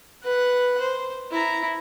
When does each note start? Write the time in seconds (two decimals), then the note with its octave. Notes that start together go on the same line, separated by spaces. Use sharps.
0.24 B4 F#5
0.80 C5
1.31 E4 A#5